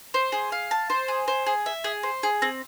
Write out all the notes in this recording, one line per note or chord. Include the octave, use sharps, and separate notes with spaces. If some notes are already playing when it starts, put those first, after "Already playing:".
C5
G#4
F5
A5
C5
G#4
C5
G#4
E5
G#4
C5
G#4
C4